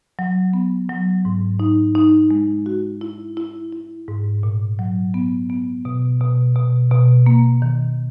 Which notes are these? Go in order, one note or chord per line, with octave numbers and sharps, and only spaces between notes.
F#3
B3
F#3
G#2
D#4
D#4
G#3
F#4
E4
E4
E4
G#2
A#2
F#3
B3
B3
B2
B2
B2
B2
A#3
D#3